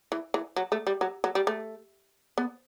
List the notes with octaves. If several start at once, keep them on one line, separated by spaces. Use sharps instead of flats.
E3
E3
F#3
A3
G3
F#3
F#3
G3
A3
B3